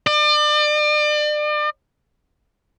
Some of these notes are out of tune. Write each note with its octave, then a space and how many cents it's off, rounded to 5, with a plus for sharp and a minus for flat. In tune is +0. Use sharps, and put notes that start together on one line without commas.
D5 +35